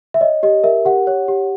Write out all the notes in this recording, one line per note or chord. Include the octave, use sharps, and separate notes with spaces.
E5
C#5 D#5
G4 D#5
A#4 E5
G4 F#5
C#5
G4